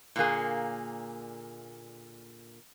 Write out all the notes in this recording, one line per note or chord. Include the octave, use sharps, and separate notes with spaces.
A#2 D3 A#3 G#4